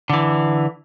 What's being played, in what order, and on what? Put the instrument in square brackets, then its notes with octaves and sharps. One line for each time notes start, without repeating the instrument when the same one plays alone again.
[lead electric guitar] D3 E3